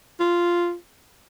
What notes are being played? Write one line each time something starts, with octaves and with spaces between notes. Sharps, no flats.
F4